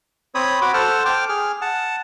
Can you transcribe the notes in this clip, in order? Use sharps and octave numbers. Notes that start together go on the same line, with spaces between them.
C4 C#5 B5 D#6
F#4 B5 D6
A4 C5 F#5 A5 F6
G5 D6 F6
G#4 F6
F#5 A5